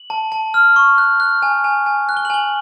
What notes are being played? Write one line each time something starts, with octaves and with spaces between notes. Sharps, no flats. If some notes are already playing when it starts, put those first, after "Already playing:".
Already playing: F#7
A5
A5
F6
C#6
F#6
F#6
G#5
G#5
G#5
F#6
G7
F#7
G#5 G7